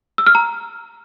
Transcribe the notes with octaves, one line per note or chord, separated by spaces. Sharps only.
E6
F6
A#5